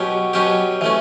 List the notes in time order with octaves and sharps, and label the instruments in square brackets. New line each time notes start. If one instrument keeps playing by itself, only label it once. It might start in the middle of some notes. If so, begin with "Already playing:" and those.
Already playing: [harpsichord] B2 F#3 C#4 G4
B2 F#3 C#4 G4
E3 A3 C#4